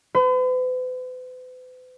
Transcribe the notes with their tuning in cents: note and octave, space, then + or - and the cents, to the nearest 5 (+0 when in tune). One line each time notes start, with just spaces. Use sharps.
B4 +45